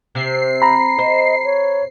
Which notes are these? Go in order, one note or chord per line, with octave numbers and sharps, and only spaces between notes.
C3 C7
A#5 B5
C5 D#5
C#5